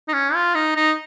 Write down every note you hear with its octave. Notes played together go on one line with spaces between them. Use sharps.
D#4
C#4
F4
D#4
D#4